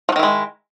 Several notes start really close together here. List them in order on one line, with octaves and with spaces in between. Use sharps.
F3 F#3 D#3 E4 G#3